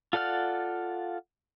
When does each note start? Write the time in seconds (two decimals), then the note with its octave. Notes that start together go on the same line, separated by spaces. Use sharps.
0.13 F4 A4 D5 F#5 F6